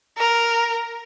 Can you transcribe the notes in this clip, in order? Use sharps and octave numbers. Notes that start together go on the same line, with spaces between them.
A#4